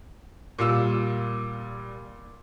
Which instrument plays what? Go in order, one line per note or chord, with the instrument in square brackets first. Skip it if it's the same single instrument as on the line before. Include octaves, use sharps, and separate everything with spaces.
[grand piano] A#2 G3 F4 E6